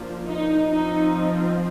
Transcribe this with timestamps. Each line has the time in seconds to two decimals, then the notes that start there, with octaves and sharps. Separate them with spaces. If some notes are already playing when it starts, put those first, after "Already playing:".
Already playing: F3 A#3 D4
0.27 D#4
0.67 F3 C4 D#4